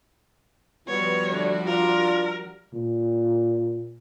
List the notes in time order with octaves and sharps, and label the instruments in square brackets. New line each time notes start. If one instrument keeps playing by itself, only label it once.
[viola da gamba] F3 G3 F#4 [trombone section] B3 [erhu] C#5
[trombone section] D3 A3 D4
[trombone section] D4 F4 [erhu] A#4
[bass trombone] A#2